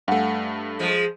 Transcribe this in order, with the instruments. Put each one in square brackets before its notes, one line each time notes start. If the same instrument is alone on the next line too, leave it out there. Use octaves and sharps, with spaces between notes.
[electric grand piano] G2 A3 [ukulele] F5 F#5 G#5
[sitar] F3 G#3